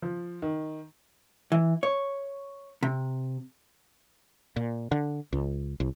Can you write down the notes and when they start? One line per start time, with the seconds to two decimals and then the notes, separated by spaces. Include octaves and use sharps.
0.02 F3
0.42 D#3
1.52 E3
1.83 C#5
2.83 C3
4.56 A#2
4.92 D3
5.33 C#2
5.80 C2